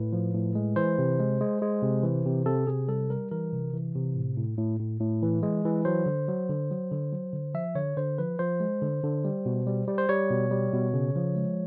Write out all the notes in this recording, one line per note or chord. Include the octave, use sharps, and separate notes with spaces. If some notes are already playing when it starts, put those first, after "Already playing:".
Already playing: A2 B4
F3
A2
G#3
E3 C5
C3
G#3
G#3
G#3
C3
E3
C3
C3 A4
C3 G#4
G3 A4
G3 A#4
E3 A#4
C3
E3
C3
A2
A2
A2
A2
A2
E3
G#3
E3
F#3 C5
D3
F#3
D3
F#3
D3
F#3
D3
F3 E5
D3 C#5
D3 C5
F3 B4
F3 C5
G#3
D3
D3
G3
B2
G3
G3
C5
G3 C#5
B2
G3
B2
C#3
F3
G#3